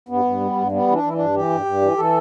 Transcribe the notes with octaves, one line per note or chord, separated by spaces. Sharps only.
G2 B3
G2
G3
G2
G3 B3
E3
D4
E3 E4
D4
G2
E3 G4
G2
G2
E3
E3 A4